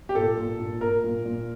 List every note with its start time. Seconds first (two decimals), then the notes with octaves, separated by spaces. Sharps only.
0.09 G4
0.15 A#2 A4
0.37 A#2
0.59 A#2
0.81 A#2 A#4
1.04 A#2
1.26 A#2